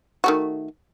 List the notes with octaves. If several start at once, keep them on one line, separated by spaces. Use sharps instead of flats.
D#3 A3 F#4